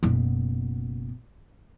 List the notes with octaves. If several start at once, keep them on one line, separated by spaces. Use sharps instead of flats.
F#1 B2